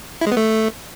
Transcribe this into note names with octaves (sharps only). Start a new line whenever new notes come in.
E4
G#3
B3
A3